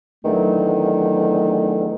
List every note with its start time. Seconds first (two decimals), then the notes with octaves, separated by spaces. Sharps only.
0.24 E2 D3 D#3 F#3 A3